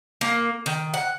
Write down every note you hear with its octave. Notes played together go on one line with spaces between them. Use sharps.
A#3
D#3
F#5